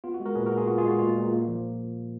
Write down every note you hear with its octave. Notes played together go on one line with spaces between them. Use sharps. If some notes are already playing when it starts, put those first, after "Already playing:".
B3 F4
F#4
G#3
F#4 A#4
A#2 G#4 B4
F#4 A#4
A#2
F4 G#4
B3 F#4
F4 G#4
G#3
F#4
A#2 F4
A#2
A#3
F3